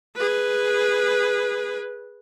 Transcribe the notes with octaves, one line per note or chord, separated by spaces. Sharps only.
G#4 B4